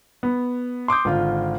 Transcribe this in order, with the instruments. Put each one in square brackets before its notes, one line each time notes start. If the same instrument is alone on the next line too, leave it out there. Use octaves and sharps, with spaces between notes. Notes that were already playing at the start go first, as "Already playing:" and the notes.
[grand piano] B3
C6 D6 D#6 G6
G#1 D3 F4